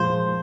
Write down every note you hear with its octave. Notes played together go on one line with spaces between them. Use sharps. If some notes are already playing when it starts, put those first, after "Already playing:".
Already playing: A#2 F3 G#3 C5